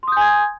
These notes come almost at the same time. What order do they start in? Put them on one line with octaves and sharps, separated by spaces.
C6 D#6 G6 G#5 G#6